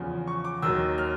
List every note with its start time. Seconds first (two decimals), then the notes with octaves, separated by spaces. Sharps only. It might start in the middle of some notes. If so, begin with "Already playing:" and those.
Already playing: E2 C#3 F3
0.27 C#6
0.45 D6
0.62 D#2 D#3 F#3 E6
0.98 F6